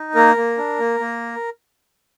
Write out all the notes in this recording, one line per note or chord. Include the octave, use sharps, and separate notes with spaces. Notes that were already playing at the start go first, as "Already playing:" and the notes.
Already playing: D#4
A#3 A#4
A#3
D4
A#3
A#3